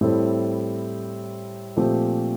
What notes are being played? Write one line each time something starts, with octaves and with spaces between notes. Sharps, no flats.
A2 G3 C4 E4 A4
A#2 F3 A3 C4 G4